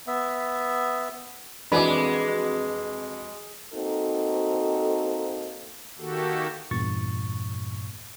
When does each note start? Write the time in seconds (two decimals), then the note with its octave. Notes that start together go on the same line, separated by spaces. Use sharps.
0.07 B3 E5
1.72 F2 E3 G#3 C4 D4 F#4 B4 D6
3.74 A#3 C4 D#4 F#4 A4
5.98 D#3 A#3 F#4 G4 A4
6.71 E2 G2 A#2 C#6 A6